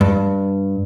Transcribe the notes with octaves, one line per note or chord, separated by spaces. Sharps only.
G2